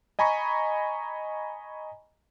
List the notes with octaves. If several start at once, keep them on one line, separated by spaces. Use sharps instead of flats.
D#5 G#5 A#5 B5 C#6